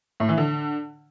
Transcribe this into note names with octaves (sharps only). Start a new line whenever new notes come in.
A2
E3
D3